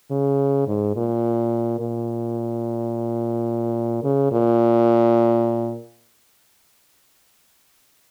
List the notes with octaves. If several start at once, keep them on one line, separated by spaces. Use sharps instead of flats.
C#3
G#2
A#2
A#2
C#3
A#2